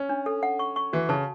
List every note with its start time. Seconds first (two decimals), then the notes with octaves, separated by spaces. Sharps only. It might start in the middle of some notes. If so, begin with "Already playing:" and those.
Already playing: C#4
0.09 D4
0.26 A4
0.43 F#5
0.59 C#6
0.76 C#6
0.93 E3 F#4
1.09 C#3 A5